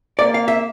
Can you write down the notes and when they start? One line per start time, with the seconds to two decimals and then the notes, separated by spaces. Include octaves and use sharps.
0.19 A#3 D5
0.34 F5
0.48 E5